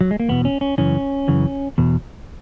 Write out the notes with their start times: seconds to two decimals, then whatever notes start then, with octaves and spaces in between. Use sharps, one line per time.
0.01 F#3
0.11 G#3
0.20 A#3
0.29 E2 B2 B3
0.45 C#4
0.61 C#4
0.78 F#2 C#3 E3 C#4
1.28 F#2 C#3 E3
1.78 E2 B2